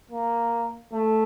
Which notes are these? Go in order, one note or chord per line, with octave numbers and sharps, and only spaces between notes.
A#3
A3